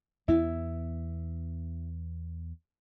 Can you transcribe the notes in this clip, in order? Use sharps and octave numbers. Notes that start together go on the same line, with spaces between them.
E2 B3 E4